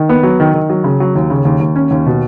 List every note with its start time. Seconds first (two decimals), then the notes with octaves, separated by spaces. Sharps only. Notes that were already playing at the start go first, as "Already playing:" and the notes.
Already playing: D#3
0.09 B3
0.23 F#3
0.40 D#3
0.54 D#3
0.70 F#3
0.84 C#3
1.00 F#3
1.15 D#2
1.30 C#3
1.45 D#2
1.60 D#2
1.76 C#4
1.91 D#2
2.06 B2